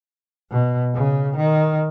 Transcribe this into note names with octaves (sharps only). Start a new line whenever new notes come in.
B2
C#3
D#3